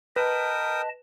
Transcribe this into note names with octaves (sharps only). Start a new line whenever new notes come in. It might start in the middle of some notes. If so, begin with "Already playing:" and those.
A#4 B4 D#5 G5 A5 D#6